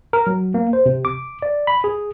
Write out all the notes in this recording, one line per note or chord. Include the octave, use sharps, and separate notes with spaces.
A#4
F#3
A#3
C5
C3
D6
D5
B5
G#4